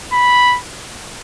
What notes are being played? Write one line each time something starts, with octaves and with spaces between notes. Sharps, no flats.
B5